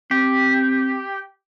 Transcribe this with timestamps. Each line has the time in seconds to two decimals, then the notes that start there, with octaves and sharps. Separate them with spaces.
0.11 C4 G4